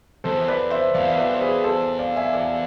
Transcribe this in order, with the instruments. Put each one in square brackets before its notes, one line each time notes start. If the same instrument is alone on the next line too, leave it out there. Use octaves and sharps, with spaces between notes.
[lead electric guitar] E2 [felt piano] A4 C5
[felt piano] B4 D5
C5 E5
[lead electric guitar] E2 [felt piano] D5 F5
[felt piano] E5
B4 D5
C5
G#4 B4
A4 C5
D5 F5
E5 G#5
D5 F5